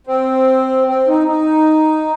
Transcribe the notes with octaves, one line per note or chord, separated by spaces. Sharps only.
C4
C4
D#4
D#4